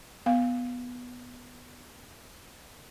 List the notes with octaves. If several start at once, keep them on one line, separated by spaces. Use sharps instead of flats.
B3 F5